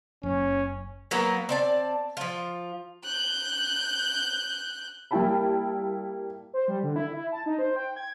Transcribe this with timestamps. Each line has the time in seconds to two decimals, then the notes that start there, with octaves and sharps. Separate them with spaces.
0.23 F#1 C#4
1.11 F#3 A#3 B3 A#4
1.49 C4 D5 A5
2.17 F3 F4
3.04 F#6 G6
5.11 G3 A#3 E4 G5 A5 B5
6.54 C5
6.68 G3
6.83 D3
6.96 E4
7.15 E4
7.32 A5
7.46 D#4
7.59 C5
7.76 G5
7.96 G#6